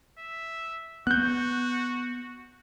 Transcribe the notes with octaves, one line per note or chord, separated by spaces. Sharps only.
E5
B3 F#4 F#6 G6